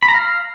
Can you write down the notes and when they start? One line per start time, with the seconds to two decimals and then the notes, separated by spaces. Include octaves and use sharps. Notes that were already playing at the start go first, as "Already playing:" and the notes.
0.03 B5
0.08 A#5
0.14 F5